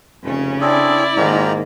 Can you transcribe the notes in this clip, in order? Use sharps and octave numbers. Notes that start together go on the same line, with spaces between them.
F1 C#3 C#4
C4 D4 E4 G#4 A4 D5
G#2 D#3 A#3 F4 G4 A#5